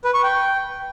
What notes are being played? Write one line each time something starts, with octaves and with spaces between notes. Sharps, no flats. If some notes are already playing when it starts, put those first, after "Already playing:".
B4
C#6
G5